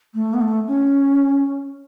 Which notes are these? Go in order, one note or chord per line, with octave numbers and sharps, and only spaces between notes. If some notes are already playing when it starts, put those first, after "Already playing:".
A3
B3
A3
C#4